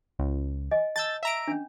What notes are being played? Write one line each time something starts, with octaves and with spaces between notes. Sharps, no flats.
C#2
D#5 G#5
A5 E6 G6 A6
E5 A#5 D7
C#4 D4